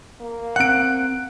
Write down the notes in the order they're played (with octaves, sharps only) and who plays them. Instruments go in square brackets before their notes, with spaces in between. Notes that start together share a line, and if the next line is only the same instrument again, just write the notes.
[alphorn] A#3
[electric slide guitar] C4 F#5 [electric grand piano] F#6 D7